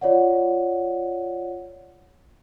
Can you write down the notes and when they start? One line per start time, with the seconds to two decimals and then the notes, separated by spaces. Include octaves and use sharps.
0.01 F4 C#5 D5 F#5